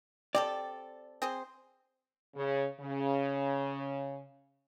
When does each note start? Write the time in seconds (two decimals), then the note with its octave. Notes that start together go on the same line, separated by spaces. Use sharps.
0.35 C4 G4 A4 D5
1.22 C4 G#4 C5
2.36 C#3
2.80 C#3